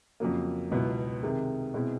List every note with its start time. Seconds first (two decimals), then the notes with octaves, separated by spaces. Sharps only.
0.20 F2 C#3 F#3 A#3
0.71 C#2 B2 F#3 B3 E4
1.23 C3 D#3 G#3
1.74 B2 G#3 C4 E4